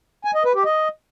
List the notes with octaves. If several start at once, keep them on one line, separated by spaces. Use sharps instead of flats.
G#5
D#5
B4
G4
D#5